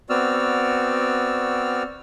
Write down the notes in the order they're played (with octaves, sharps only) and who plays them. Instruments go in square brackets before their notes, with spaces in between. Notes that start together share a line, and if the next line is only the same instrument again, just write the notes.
[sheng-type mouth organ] B3 C4 F#4 D5 E6 F6